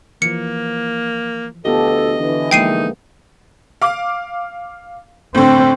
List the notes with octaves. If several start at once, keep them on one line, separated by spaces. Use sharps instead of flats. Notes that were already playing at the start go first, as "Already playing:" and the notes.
E3 F3 A#3 C#7
D2 B3 F4 G4 A4 D#5
D3 E3
F3 G#3 A#3 D#4 G5 C7 D#7
F5 D6
A2 D3 C4